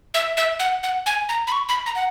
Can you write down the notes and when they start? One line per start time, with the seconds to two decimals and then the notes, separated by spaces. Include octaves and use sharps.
0.14 E5
0.37 E5
0.59 F#5
0.83 F#5
1.06 G#5
1.29 A#5
1.47 B5
1.52 C#6
1.69 B5
1.86 A#5
1.95 F#5